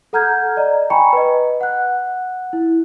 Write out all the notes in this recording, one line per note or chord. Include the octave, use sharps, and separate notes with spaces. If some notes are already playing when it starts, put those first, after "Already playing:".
A4 F#5 A#5 F6 G6 G#6
D5 D#5 A#5
G5 G#5 A#5 B5 C#6 C#7
B4 D#5
F#5 F#6
E4